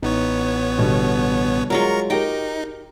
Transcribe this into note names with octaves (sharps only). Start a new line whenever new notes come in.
A1 B3 D#4 C#5
B2 D3 G3
F#3 G#3 F4 A#4 A#5 C#6
D#4 F#4 G4 A#4 G5 A#5